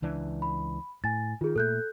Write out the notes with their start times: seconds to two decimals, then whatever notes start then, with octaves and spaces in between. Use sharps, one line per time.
0.02 C#2 E3 D4
0.42 B5
1.04 A2 G#5 A6
1.41 D#3 F4 G#4
1.56 A#2 A3 A4 F#6 G6